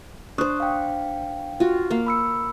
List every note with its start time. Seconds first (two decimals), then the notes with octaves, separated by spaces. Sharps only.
0.38 D4 C5 C#6 D#6 F#6
0.60 F5 G5
1.60 F4 F#4
1.91 A#3 F5
2.06 B5 E6 C#7